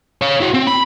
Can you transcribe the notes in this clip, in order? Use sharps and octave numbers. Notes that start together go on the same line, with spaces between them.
C#5 F5
E4 F#4
C4
B5